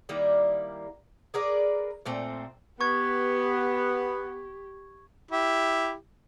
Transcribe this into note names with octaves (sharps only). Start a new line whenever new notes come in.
D#3 G3 A#3 E4
G#4 A#4 B4 D5
A#2 A3 C4
B3 G4 C#6 G#6
E4 G4